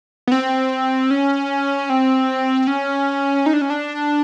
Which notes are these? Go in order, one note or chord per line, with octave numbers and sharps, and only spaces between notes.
B3
C4
C#4
C4
C#4
D#4
D4
C#4
D4